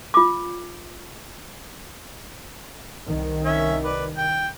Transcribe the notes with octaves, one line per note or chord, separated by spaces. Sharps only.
F4 D6
C2 D#3
C#4 E5
B4 D5
G5